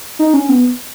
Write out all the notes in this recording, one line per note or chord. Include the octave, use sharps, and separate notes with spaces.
D#4
C#4
B3